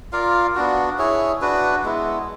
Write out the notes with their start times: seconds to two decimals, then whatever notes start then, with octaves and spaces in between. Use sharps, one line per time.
0.12 F4 A#4 D5 F5
0.55 B3 D4 F#4
0.98 E4 G#4 C#5
1.41 D4 F#4 B4
1.84 G#3 B3 E4